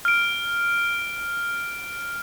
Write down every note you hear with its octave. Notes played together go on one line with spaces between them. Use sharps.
F6 D7